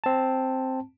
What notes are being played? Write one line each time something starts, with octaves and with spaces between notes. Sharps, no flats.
C4 A5